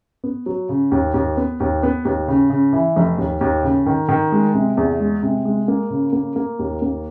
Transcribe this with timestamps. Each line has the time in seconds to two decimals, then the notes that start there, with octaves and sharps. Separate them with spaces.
0.24 B3
0.46 F#3
0.69 C#3
0.92 D#2
1.14 D#2
1.37 B3
1.60 D#2
1.83 B3
2.05 D#2
2.28 C#3
2.50 C#3
2.73 E3
2.96 F1
3.18 D#2
3.41 D#2
3.63 C#3
3.86 D#3
4.09 D#3
4.32 G#3
4.54 C3
4.77 E2
5.00 G#3
5.23 C3
5.45 G#3
5.68 A#3
5.90 C#3
6.13 A#3
6.36 A#3
6.59 D#2
6.82 A#3